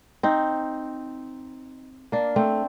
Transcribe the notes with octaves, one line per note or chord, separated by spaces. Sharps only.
C4 D#4
A#3 D4
A3 C4